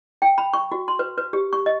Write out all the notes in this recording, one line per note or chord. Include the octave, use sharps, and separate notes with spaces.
G5
B5
C#6
F#4
C6
B4
B4
G4
C#6
D#5